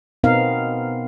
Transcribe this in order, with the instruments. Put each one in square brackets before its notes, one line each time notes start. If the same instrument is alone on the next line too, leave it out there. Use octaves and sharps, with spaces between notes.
[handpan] B2 B3 C4 D#4 A#4 F5